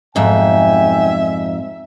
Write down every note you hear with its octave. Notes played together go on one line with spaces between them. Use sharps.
B1 F2 G#2 E5 G5 G#5